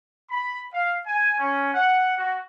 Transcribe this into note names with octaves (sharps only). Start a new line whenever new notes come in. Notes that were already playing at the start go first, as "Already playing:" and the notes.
B5
F5
G#5
C#4
F#5
F#4